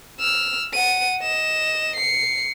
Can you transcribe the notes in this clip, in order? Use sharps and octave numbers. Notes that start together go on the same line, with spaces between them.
E6 F6
F#5 D#7
D#5 E7
C7 C#7